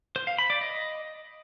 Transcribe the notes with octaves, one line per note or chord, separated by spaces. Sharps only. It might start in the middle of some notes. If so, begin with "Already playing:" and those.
C5
F5
B5
D5
D#5